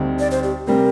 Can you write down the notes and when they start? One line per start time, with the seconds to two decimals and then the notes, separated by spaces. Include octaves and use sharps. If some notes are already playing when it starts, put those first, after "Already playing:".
Already playing: D2 D3 G3 C4 D#4
0.19 D5
0.31 C5
0.43 G4
0.67 C3 G3 C4 A#4